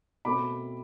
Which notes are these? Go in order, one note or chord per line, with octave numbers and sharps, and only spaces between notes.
B2 A3 C4 B5 D6